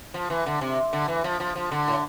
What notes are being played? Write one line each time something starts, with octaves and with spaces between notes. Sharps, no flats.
F3
E3
D3
C3
D3
E3
F3
F3
F3
D3
A2